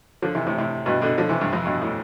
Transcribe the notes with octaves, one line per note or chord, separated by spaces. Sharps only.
D3 F3
C3 E3
A2 C3
A2 C3
G2 B2
B2 D3
D3 F3
C3 E3
G2
F2
G2 B2
A2